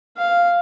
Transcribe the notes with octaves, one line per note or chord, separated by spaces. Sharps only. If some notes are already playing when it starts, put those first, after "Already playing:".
F5